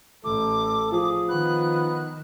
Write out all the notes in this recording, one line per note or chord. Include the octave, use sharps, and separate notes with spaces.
A1 A4 D6
F3 G#4
D#3 B3 F#6